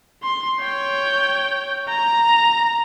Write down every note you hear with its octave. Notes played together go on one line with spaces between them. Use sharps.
C6
C#5 G5
A#5